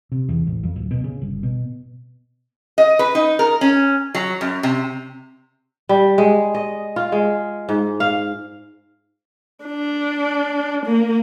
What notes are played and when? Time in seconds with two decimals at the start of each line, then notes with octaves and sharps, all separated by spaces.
0.12 C3
0.29 E2
0.47 A1
0.63 F2
0.76 D1
0.91 B2
1.04 C#3
1.21 G1
1.43 B2
2.78 D#5
2.99 B4
3.15 D#4
3.39 A#4
3.61 C#4
4.15 F#3
4.41 F#2
4.63 C3
5.89 G3
6.18 G#3
6.55 D#5
6.96 F4
7.12 G#3
7.69 G#2
8.00 F5
9.65 D4
10.86 A#3